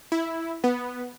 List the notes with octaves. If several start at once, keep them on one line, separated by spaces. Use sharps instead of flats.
E4
B3